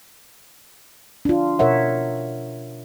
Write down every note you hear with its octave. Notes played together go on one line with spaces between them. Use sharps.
D4 F4
B2 A#4 C#5 E5 F#5